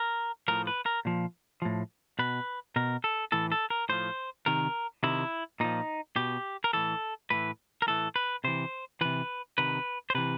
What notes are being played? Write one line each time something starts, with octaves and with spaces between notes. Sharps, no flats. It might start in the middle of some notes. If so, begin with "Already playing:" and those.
Already playing: A#4
A2 F3 A#4
B4
A#4
A#2 F3
A2 F3
B2 B4
B2 A#4
A4
A2 E3 A4
A4
A#4
A2 F3 C5
C3 D#3 A#4
C3 D#3 E4
A#2 F3 D#4
B2 G4
A#4
A2 E3 A4
A2 E3 B4
A#4
A2 E3 A4
B4
C3 E3 C5
C3 E3 B4
C3 D#3 B4
C5
C3 E3 B4